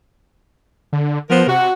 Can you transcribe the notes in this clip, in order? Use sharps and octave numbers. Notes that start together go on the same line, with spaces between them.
D3
F3 B3 A#4 C5
C3 F#4